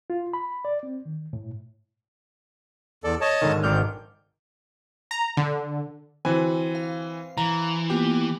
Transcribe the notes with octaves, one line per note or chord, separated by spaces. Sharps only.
F4
B5
D5
C4
D#3
A2
E2 A4 D5
C#5 D#5 A5
G#2 D3 D#3
G#1 C4 D5 F6 G6
A#5
D3
D3 E3 C4 F#4 B4 G#5
F5
E3 A#5
A#3 B3 F4 G4